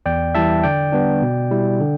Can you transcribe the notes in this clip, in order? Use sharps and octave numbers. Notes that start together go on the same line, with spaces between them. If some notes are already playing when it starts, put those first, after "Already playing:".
E2 D5 G5
E3 G3 E4 E5 A5
D3 D5 G5
G3 B3 D4
B2
G3 E4
D3